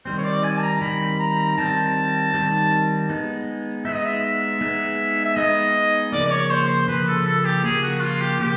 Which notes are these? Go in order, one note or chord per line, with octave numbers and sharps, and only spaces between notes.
D#3 G3 C4 C5
C#5
D5
G#5
A5
A#5
D#3 G3 C4 B5
A#5
D#3 G3 C4 A5
D#3 G3 C4
G#3 B3 D#4
G#3 B3 D#4 E5
D#5
E5
G#3 B3 D#4
E5
G#3 B3 D#4 D#5
C#3 F3 A#3 D5
D5
C#5
C5
C5
C#3 F3 A#3 B4
A4
A4
G4
C#3 F3 A#3 G#4
F#4
F4
G4
C#3 F3 A#3 G4